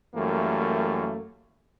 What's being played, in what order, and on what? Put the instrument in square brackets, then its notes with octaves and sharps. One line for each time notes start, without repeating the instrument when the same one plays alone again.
[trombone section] F#2 E3 G3 A3 A#3